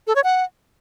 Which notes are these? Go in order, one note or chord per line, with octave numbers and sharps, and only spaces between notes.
A4
C#5
F#5